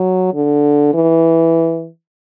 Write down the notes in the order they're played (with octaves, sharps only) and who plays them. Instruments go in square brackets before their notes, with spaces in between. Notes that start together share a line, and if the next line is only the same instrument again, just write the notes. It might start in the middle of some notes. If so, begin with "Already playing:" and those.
Already playing: [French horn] F#3
D3
E3